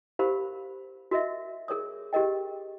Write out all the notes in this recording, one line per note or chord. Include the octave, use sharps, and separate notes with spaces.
G4 A#4 C5 F5 B5
F#4 A#4 D#5 E5
G#4 A#4 C#5 D#6
G4 G#4 A#4 D#5 G5